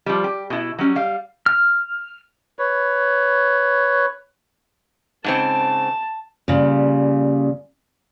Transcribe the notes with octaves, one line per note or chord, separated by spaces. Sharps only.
F3 G3
G4
B2 E4
F#3 G3 C#4
G3 F5
F6
B4 C#5
G#2 C#3 C4 A5
A#2 C#3 G3